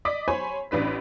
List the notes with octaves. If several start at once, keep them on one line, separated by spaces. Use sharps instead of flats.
D5 D#5 D6 D#6 B6
C5 C#5 G#5 B5 C6
A1 D4 B4 B6